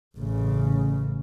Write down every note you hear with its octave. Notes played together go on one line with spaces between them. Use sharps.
A1 C#3